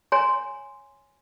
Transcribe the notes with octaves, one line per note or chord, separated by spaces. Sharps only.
C#5 G#5 A#5 C6